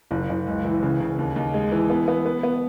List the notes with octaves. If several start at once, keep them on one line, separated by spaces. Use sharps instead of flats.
F#1
F#1
C#2
E3
C#3
C#3
D#2
D#2
G#3
E3
B3
B3
B3
B3